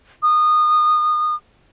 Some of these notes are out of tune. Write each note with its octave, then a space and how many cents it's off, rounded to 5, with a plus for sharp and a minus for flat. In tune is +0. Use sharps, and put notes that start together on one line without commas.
D#6 -25